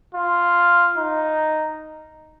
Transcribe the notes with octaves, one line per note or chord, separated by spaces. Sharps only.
F4
D#4